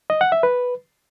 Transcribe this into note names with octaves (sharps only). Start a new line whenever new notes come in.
D#5
F#5
E5
B4